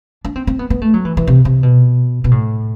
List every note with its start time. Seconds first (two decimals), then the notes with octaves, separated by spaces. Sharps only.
0.25 D4
0.36 C4
0.47 C4
0.59 B3
0.70 B3
0.82 A3
0.94 F#3
1.05 E3
1.17 E3
1.27 C3
1.45 C3
1.63 B2
2.24 B2
2.31 A2